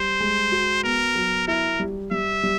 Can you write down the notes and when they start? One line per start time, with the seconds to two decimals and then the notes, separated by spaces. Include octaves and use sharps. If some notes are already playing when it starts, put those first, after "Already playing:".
Already playing: G3 C5
0.20 G#3
0.52 F#4
0.84 B3 A#4
1.15 F#3
1.48 E4 A#4
1.80 G3
2.11 G3 E5
2.43 G3